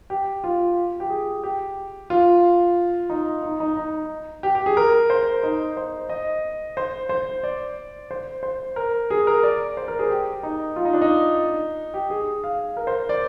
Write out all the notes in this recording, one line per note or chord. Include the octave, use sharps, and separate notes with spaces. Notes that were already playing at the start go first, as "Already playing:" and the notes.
G4
F4
G4
G#4
G4
F4
D#4
D#4
D#4
D#4
G4
G4
G#4
A#4
C5
D#4
C5
D#5
C5
C5
D5
C5
C5
A#4
G#4
A#4
D5
C5
A#4
G#4
G4
D#4
F4
D#4
D4
D#4
G4
G#4
F5
A#4
C5
D5